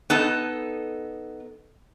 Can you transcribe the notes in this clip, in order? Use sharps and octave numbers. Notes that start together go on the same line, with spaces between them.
B3 D#4 A4